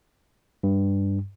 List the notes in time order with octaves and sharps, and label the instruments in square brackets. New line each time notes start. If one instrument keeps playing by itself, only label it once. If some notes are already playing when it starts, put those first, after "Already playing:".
[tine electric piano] G2